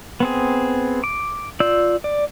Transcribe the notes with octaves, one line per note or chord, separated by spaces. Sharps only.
B3 C4 G#4
D6
F4 D5 E6 G6
D5